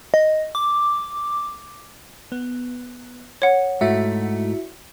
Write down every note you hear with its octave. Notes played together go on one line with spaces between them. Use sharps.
D#5
D6
B3
C#5 F#5
G#2 A3 E4 F#4 E5